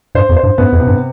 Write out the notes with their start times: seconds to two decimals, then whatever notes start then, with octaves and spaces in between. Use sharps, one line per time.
0.15 G2 C5
0.29 F2
0.36 C5
0.43 G2
0.58 G2 B3
0.73 F2
0.80 C3
0.87 G2